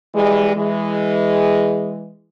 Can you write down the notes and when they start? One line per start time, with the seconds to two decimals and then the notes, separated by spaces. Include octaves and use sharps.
0.15 E3 G3 G#3
0.56 E3 G#3